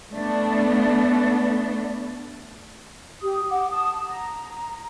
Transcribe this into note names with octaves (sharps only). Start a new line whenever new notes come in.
A3 B3 D4
G4 D#6
F#5 D6
A5 D#6
A#5